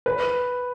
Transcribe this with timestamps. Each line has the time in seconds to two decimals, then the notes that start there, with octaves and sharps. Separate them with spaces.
0.06 B4